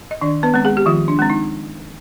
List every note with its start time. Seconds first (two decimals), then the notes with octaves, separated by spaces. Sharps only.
0.11 D#5
0.21 D#3 D4 D5
0.43 B3 B4
0.54 G#3 C4
0.65 G#3 G#4
0.77 G4
0.86 D#3 F3 F4
1.08 D4
1.19 G#3 C4
1.30 D#4